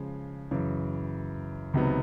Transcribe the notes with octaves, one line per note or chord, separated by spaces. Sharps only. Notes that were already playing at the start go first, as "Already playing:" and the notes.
Already playing: C#3 F3 G#3
F#2 C#3 E3
C#2 C3 D#3 F#3 B3